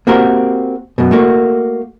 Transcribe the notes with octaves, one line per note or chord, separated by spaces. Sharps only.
A#3 C4 F#4 G4 A#4
F#2 B2
A3 A#3 F#4